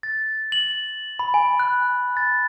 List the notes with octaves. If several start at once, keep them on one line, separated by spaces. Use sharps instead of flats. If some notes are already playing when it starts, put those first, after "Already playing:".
A6
F#7
B5
G#5
F#6
A6